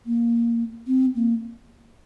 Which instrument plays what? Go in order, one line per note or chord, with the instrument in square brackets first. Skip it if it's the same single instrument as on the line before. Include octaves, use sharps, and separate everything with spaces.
[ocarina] A#3
C4
A#3